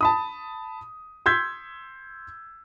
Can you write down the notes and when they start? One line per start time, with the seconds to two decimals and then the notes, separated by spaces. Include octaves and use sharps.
0.01 A5 B5 D#6
1.26 C6 E6 G6 G#6 B6